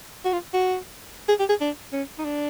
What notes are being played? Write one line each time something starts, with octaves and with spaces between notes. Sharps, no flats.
F#4
F4
F#4
G#4
G4
G#4
D4
C#4
D#4
D4